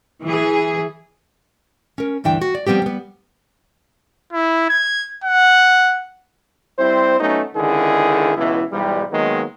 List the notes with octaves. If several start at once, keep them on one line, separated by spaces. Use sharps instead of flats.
E3 G#4
C#4 A#4
D2 G2 E3 D4 G5
F#4
D5
F3 G3 B3 C4 G4
G3 B3
E4
G#6
F#5
G3 C4 E4 C5
F#3 A3 B3 C#4 D#4
C#2 D3 D#3 E4 G#4
C#2 B2 E3 E4
B1 G#2 E3 G3
D#3 F#3 G#3 A#3 B3